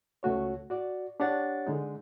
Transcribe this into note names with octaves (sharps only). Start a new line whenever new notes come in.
C#2 A3 F#4 C#5
F#4 D5
D4 G4 C#5 F#5 A6
D3 G#3 D#4